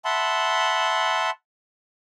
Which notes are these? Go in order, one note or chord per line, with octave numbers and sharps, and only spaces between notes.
E5 F#5 A5 B5 C6